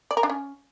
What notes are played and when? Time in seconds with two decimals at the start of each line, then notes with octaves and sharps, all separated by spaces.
0.11 D5
0.17 A#4
0.23 D4
0.30 C#4